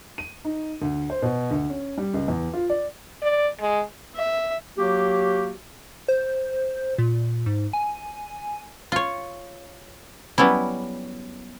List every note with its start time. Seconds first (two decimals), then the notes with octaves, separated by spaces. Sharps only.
0.18 D#7
0.45 D#4
0.82 D2
1.10 C5
1.22 B2
1.51 D2
1.70 C#4
1.97 G3
2.14 C#2
2.28 E2
2.53 F4
2.70 D5
3.22 D5
3.60 G#3
4.15 E5
4.78 F#3 A#3 F#4 G4
6.08 C5
6.98 A#2
7.46 G#2
7.73 G#5
8.92 F4 C#5
10.38 F#3 G3 B3 C#4 E4